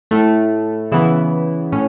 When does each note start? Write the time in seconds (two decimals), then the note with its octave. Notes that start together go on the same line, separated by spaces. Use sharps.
0.11 A2 A3
0.92 C#3 E3 B3 E4
1.72 A2 C#4